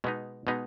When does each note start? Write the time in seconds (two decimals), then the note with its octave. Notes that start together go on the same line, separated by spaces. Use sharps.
0.04 B2 G#3 B3 D#4
0.47 B2 G#3 B3 D#4